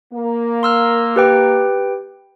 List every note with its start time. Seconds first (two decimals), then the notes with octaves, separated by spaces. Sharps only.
0.13 A#3
0.63 C6 E6 F6
1.16 G4 B4 G5